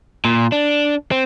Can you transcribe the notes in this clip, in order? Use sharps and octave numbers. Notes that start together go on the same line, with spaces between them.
A#2
D4
C4